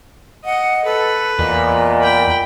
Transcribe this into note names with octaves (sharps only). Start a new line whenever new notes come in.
D#5 F#5
A4 B4
E2 A#2 D#5
G5 B5